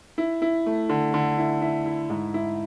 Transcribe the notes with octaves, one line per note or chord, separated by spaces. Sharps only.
E4
E4
A3
D3
D3
E4
E4
E4
G#2
E4